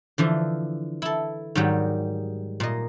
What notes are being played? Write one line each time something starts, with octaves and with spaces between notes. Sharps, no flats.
D3 E3 F3
E4 A4
G#2 D#3 F#3 G3
A#2 D#5